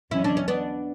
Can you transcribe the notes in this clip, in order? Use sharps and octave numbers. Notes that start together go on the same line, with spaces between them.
E2 D3 F#3 C#4 E4
D4
C#4
B3 D4